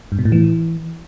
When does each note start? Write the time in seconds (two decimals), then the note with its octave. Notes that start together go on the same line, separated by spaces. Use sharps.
0.12 G2
0.19 B2
0.25 A2
0.32 E3